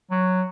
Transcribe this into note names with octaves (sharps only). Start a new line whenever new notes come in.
F#3